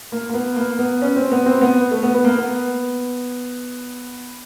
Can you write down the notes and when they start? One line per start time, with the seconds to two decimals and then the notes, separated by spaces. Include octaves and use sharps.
0.12 A#3
0.29 A#3
0.34 B3
0.56 A#3
0.79 B3
1.02 C#4
1.16 C4
1.32 B3
1.46 C4
1.61 B3
1.91 A3
2.03 B3
2.14 B3
2.24 A#3
2.36 B3